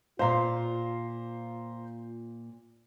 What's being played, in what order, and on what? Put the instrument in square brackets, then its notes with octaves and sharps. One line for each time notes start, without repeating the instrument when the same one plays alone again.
[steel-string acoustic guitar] A#2 F5 [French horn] F4 [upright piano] C5 A#5 C6